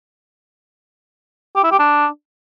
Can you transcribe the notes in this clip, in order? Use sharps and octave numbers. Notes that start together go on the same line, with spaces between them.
G4
E4
G4
D4